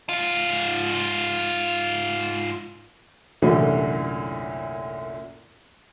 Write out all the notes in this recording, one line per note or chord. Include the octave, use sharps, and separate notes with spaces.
G#2 F4
C2 F#2 A#2 D3 E3 A3